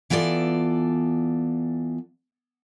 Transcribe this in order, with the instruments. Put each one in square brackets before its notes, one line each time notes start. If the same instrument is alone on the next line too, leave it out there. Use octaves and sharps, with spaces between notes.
[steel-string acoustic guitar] E3 B3 F4 A4 D5